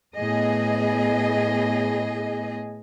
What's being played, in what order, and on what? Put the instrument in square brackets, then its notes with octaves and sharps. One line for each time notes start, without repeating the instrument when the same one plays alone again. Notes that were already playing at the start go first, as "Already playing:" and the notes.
[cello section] A2 B3 G#4 D#5